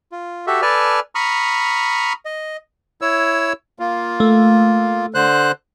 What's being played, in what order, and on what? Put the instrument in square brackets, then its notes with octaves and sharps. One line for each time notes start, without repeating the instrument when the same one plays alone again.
[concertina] F4
F#4 G4 A4 E5
A4 B4 D5 G#5 A5 F6
A#5 B5 C#6 D#6 F6
D#5
[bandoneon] E4 C#5 E6
A#3 F4
[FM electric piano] A3
[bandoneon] D3 C5 F#6